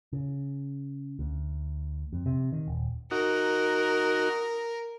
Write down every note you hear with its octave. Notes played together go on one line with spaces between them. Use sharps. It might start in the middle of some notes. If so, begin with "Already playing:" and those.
C#3
D2
F2
C3
D#3
D#1
D#4 F#4 A#4